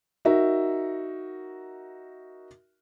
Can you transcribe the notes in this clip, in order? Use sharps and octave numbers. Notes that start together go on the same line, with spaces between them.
D#4 F#4 A#4 E5